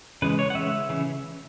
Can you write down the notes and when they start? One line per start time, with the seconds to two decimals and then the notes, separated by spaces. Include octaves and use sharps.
0.22 C#3 E3 G#3 B4
0.39 C#5
0.50 F#5
0.55 C#3 E3 G#3 E5
0.89 C#3 E3